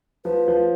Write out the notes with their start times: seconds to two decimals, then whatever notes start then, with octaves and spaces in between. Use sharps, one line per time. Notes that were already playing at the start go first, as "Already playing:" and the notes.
0.25 F3 B4
0.48 F3